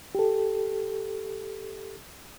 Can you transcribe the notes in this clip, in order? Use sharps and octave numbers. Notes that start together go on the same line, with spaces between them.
G4 A4